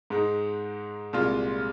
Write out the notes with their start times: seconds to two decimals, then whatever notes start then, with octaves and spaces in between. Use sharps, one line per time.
0.10 G#2 G#3 D#4
1.13 C2 A#2 G#3 F4